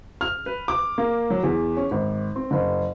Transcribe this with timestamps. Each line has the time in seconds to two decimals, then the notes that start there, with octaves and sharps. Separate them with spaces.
0.21 F6
0.46 B4
0.68 D6
0.98 A#3
1.30 F#3
1.43 E2
1.77 C#4
1.91 G#1
2.36 C4
2.51 F#1